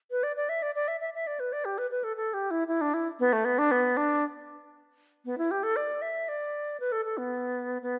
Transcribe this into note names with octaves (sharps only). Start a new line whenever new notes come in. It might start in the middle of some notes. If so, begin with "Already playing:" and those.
B4
D5
D5
E5
D5
D5
E5
E5
E5
D5
B4
D5
G4
B4
B4
A4
A4
G4
E4
E4
D4
E4
B3
A3
B3
D4
B3
D4
B3
E4
G4
A4
D5
E5
D5
B4
A4
A4
B3
B3